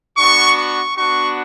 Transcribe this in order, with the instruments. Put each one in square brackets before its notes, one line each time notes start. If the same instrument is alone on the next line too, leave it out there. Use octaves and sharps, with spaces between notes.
[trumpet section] B3 D4 F#4 C#6
C#6
B3 D4 F#4 C#6